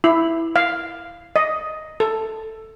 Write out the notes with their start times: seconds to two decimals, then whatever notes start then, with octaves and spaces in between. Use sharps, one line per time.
0.04 E4
0.56 F5
1.36 D#5
2.00 A4